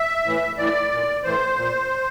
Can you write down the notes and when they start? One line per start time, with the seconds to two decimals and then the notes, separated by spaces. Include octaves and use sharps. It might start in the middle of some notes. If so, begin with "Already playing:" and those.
Already playing: E5
0.25 A2 E3
0.58 A2 E3 D5
0.91 A#2
1.24 A2 E3 C5
1.57 A#2